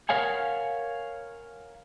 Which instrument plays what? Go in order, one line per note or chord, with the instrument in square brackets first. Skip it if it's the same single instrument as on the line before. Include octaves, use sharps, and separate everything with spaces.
[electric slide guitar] A#4 C#5 F5 F#5 G#5